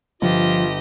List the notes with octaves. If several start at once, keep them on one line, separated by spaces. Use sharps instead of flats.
G1 F3 F4 G4 D#5